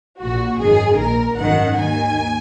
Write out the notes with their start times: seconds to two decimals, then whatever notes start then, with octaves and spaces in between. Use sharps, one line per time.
0.20 A#1 A#2 F#4
0.59 G#1 F#2 D#3 G#4
0.99 A#1 A#2 A#4
1.39 G#1 F#2 D#3 F#5
1.78 D#2 D#3 G#5